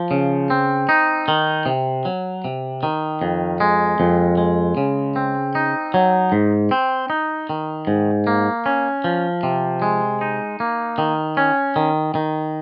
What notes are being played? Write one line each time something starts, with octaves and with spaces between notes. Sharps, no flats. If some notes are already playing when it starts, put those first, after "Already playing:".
Already playing: F3
C#3
C4
D#4
D#3
C3
F#3
C3
D#3
F2
G#3
F2
G#3
C#3
C4
D#4
F#3
G#2
C4
D#4
D#3
G#2
A#3
C#4
F3
C3
G#3
D#4
A#3
D#3
C#4
D#3
D#3